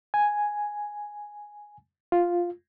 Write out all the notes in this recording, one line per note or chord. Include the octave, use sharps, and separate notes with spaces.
G#5
F4